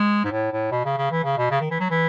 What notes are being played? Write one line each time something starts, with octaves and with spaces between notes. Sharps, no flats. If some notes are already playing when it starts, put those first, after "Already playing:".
Already playing: G#3
G#2
A2
A2
B2
C#3
C#3
E3
C#3
B2
C#3
D#3
E3
F#3
E3